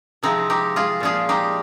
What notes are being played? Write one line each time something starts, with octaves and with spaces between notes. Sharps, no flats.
C3 F3 G#3 C4 D#4
D#4 G4
F4 G#4
A#2 F3 G#3 F4 G#4
D#4 G4